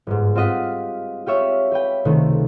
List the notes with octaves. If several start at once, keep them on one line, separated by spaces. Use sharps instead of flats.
G1 G#2
C4 F4 G4 D#5 F#5 B6
F4 G4 C#5 E5
G4 B4 G5
C#2 C3 D#3 A3